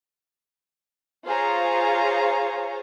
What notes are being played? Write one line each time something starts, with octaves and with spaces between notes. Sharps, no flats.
F4 G#4 C5 C#5 F5 A#5